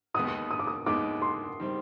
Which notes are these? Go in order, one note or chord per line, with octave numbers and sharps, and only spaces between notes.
D#2 D#3 G#3 B3 D#4 D#6
D#6
D6
D#6
D#2 D#3 G#3 B3 D#4 D6
C6
D#3 G3 C4